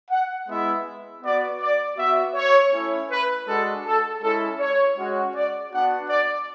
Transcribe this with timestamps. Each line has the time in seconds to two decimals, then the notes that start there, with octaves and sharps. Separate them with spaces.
0.11 F#5
0.48 G#3 B3 E4 E5
1.23 B3 F#4 D5
1.61 D5
1.98 B3 F#4 E5
2.36 C#5
2.73 A3 C#4 E4
3.11 B4
3.48 G#3 D4 F#4 A4
3.86 A4
4.22 G#3 C#4 E4 A4
4.60 C#5
4.98 G#3 C#4 F#4
5.36 D5
5.72 B3 D4 F#4 F#5
6.09 D5